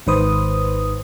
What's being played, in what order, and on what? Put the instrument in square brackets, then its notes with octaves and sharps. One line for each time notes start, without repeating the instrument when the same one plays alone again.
[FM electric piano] G#1 G#2 D#3 B4 C5 D#6